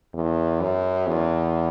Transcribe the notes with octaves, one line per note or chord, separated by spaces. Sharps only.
E2
F#2
E2